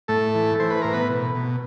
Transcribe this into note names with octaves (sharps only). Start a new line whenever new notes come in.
A2 A3 A4
E3
E3 C5
B4
A2 A#4
B3 B4
B2
B2